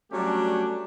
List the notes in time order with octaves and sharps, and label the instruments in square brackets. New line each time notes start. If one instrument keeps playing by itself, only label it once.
[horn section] F#3 G3 A3 C#4 D4 G4